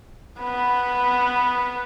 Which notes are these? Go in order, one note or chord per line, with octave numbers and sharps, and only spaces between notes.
B3 B4